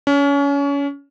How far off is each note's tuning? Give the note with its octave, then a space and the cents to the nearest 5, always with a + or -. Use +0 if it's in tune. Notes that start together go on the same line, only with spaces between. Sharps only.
C#4 +30